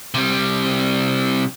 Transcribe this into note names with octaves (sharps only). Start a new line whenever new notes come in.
C3 G3